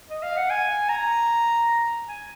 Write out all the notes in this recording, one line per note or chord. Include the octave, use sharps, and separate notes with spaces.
D#5
F5
F#5
G#5
A#5
G#5